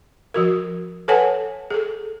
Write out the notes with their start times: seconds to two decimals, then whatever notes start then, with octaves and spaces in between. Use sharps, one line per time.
0.34 F3 F#4 A#4
1.08 A4 B4 C#5 F#5 G#5 A5
1.70 G#4 A4